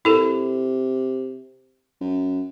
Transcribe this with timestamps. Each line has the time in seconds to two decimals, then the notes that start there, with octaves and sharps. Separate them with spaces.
0.05 C3 E4 A4 A#4
2.01 F#2